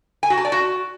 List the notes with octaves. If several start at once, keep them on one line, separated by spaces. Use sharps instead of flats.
G#5
F#4
A5
D5
F#4